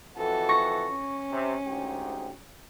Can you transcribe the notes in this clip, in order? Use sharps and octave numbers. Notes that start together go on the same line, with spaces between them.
F2 E3 F#4 A4
C#6 A#6
C#4
C3
D2 G#2 G4